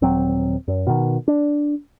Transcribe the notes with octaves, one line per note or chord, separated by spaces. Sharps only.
D#1 F#3 C4
F#2
B2 D#3
D4